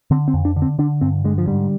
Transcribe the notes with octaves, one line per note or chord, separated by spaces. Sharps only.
D3 C4
C4
F2
D4
D3
C4
D3 D4
G2 C4
D3 G#3
F3
G#2 G3